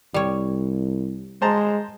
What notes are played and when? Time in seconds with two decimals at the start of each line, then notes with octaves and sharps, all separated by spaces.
0.14 C2 G3 C#5
1.42 G#3 C5 A5 A#5